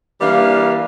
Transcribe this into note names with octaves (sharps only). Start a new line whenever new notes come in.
E3 G3 A#3 D4 F5